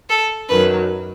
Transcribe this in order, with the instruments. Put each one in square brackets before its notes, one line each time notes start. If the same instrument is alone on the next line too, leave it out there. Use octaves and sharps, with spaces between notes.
[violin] A4
[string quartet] F#2 D#3 F#3 [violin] B4